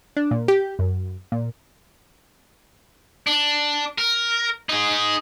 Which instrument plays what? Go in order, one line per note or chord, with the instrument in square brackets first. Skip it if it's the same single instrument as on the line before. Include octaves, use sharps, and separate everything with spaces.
[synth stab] D4
A#2
G4
F#2
A#2
[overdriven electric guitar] D4
A#4
D#4 G#4